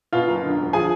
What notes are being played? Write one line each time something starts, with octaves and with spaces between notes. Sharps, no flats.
B2 F4 F5
F#1
D3
E1
F3 G#4 G#5